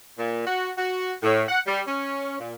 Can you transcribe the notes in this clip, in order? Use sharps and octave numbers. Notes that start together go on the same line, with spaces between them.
A#2
F#4
F#4
A2
F#5
G3
C#4
A#2